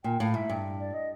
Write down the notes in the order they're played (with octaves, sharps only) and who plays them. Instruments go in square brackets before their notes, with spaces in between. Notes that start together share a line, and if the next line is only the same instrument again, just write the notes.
[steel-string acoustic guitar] A#2 [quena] G5
[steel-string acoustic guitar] A2 [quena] F5
[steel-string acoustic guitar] G#2 [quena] E5
[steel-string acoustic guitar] G2
[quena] D5
D#5